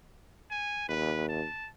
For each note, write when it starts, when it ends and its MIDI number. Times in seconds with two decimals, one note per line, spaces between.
0.51 0.87 80
0.89 1.46 39
0.89 1.27 71
1.29 1.69 81